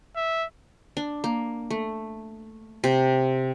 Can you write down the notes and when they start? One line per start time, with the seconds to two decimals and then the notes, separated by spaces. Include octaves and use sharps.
0.16 E5
0.97 D4
1.24 A#3
1.70 A3
2.84 C3